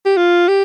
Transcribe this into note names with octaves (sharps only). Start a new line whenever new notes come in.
G4
F4
G4